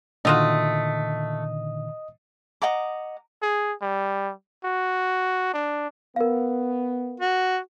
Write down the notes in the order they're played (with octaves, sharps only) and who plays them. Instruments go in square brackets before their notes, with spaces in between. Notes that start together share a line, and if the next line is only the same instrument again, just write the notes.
[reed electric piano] A#2 D3 D#3 [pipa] A3 F4 F#4 [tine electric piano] D#5 D#6
[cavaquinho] D#5 F#5 A#5 D6
[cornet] G#4
G3
F#4
D4
[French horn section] B3 [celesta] A#4 F5
[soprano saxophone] F#4